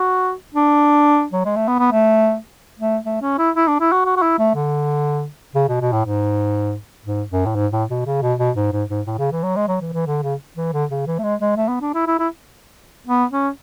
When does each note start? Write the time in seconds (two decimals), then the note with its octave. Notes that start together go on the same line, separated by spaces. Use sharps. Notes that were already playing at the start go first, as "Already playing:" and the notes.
Already playing: F#4
0.55 D4
1.33 F#3
1.45 G#3
1.56 A3
1.68 B3
1.79 B3
1.92 A3
2.80 A3
3.05 A3
3.22 C#4
3.39 E4
3.56 E4
3.68 D4
3.80 E4
3.92 F#4
4.05 F#4
4.17 F#4
4.22 E4
4.39 A3
4.55 D3
5.55 C#3
5.68 B2
5.81 B2
5.92 A2
6.05 G#2
7.05 G#2
7.31 F#2
7.46 A2
7.55 G#2
7.72 A2
7.90 B2
8.06 C#3
8.22 B2
8.39 B2
8.56 G#2
8.72 G#2
8.90 G#2
9.07 A2
9.19 C#3
9.32 E3
9.44 F#3
9.56 G#3
9.68 F#3
9.81 E3
9.93 E3
10.07 D3
10.23 C#3
10.57 E3
10.73 D3
10.90 C#3
11.07 E3
11.19 A3
11.23 G#3
11.40 G#3
11.57 A3
11.68 B3
11.81 D4
11.95 E4
12.07 E4
12.19 E4
13.07 B3
13.31 C#4